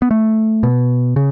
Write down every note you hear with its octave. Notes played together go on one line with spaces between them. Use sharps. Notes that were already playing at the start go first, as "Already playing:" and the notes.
B3
A3
B2
C#3